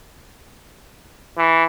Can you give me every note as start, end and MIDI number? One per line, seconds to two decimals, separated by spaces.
1.38 1.65 52